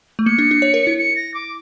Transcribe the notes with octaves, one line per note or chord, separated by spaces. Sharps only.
A3
A#3 C#7
D4
D4
C#5
A#4
E4
C#7
A#6
D6